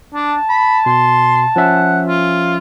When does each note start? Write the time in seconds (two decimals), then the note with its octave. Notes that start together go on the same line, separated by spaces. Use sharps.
0.15 D4 A5
0.49 B5
0.86 B2 C6
1.56 F3 C#4 E5 F#5
2.07 F4